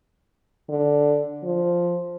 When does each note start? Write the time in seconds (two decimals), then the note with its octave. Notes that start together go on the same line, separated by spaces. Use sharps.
0.69 D3
1.43 F3